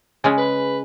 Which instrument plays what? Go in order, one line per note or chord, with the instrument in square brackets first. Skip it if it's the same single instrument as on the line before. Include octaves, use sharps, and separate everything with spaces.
[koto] C#3 G#3 C#4 [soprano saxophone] G#5
[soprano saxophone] B4